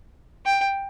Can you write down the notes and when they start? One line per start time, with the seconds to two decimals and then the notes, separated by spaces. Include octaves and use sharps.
0.45 G5